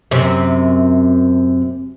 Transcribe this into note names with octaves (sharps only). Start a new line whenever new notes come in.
F#2 C3